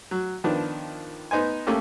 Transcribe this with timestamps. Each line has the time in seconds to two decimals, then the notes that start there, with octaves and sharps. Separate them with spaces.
0.11 F#3
0.44 D#3 F3 B3 D4
1.31 B3 D#4 C5 G#5
1.67 A3 A#3 C#4 G4 A4